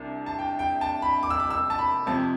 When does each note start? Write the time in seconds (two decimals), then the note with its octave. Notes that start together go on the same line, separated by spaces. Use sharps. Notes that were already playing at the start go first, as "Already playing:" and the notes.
Already playing: C2 C3 D4
0.26 A5
0.39 G5
0.59 G5
0.81 A5
1.02 B5
1.23 D6
1.30 E6
1.40 D6
1.50 E6
1.70 A5
1.79 B5
2.07 F2 C3 F3 A5